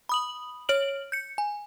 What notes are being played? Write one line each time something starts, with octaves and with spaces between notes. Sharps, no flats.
B5 D#6 F#7
C#5 F6 D7 F#7
G6 C#7
G#5